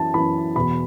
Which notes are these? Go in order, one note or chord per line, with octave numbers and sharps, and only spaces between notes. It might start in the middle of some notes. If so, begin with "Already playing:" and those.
Already playing: F#2 E3 A5
F#2 E3 B5
E2 B2 B5